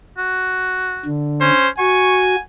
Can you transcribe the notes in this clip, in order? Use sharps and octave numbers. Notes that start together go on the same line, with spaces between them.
F#4
D3
C#4 C5
F#4 G#5 C#6